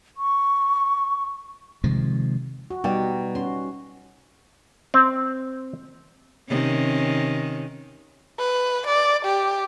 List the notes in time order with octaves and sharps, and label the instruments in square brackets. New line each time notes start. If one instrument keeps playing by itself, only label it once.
[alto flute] C#6
[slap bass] C3 D#3 F3 G#3
[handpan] F#4
[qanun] B2 [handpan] G3 D#4 [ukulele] D5 G5
[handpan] C#4 F#4 [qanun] C6
[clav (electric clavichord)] C4
[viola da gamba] C3 D#3 C#4
[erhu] B4
D5
G4